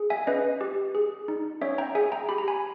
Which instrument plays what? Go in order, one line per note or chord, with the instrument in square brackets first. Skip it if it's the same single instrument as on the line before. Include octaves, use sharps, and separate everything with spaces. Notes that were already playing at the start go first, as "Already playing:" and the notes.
Already playing: [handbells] G#4
E5 G#5
C#4 B4 D#5
G4
G#4
D#4
C#4 C#5 E5
G5 A#5
G#4 E5 G#5
G5 A#5
G4 B5
A#5
G#5 B5